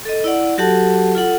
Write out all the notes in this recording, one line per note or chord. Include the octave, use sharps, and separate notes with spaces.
A4 D#5
E4 D5 F#5
F#3 F#4 G4 A4 F#5 A5
F4 A4 F#5